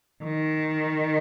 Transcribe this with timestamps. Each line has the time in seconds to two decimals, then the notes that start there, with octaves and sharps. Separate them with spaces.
0.24 D#3